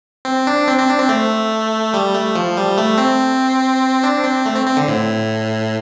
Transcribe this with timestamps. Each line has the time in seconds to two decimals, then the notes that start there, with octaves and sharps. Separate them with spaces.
0.25 C4
0.47 D4
0.67 C4
0.78 C4
0.89 D4
0.99 C4
1.09 A3
1.94 G3
2.14 A3
2.35 F3
2.57 G3
2.78 A3
2.98 C4
4.03 D4
4.24 C4
4.46 A3
4.56 C4
4.66 C4
4.77 D3
4.88 A2